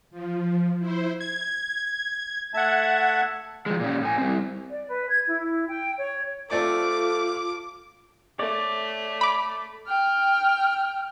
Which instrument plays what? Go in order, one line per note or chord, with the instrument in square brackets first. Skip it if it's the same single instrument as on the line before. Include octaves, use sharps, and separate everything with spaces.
[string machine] F3
E4 C5
[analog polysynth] G#6
[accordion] A3 E5 A5 [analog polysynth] F#5 G#6
[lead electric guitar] F3 G#3
A#2 C#4
A2 G#5
G3 C4
[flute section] D5
B4
G#6
E4
G5
C#5
[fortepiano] A3 C4 D5 [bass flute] F4 [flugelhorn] A4 [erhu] D6
[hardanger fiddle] A3 [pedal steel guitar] C#5 D5
[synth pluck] B5 D6
[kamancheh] G5 F6